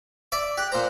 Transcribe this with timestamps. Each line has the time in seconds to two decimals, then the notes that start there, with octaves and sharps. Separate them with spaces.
0.32 D5 E5 D6
0.58 G4 F#6
0.72 A#2 C5 A#5